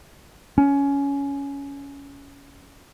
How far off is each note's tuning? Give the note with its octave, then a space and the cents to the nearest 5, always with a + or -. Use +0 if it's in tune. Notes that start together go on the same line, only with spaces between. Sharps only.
C#4 +15